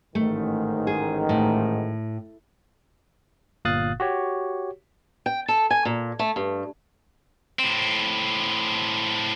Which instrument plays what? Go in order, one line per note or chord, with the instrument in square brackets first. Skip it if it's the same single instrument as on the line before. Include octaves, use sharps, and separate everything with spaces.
[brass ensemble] A1 G#2 D#3 [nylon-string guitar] A3
[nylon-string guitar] G#4
A2
[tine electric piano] G1 A#2 F5 D#6 F#6 A6
F#4 G4 C#5
[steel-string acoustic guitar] G5
A4
G#5
A#2
A3
G2
[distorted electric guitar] A2 C4